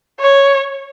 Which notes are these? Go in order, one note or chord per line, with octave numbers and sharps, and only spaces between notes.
C#5